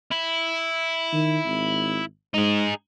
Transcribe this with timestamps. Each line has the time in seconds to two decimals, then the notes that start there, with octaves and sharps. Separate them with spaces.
0.12 E4
1.13 D#3
1.45 G#1
2.34 G#2 D#4 G#4